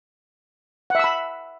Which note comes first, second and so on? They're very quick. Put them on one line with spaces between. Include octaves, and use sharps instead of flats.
F#5 E5 E6 B5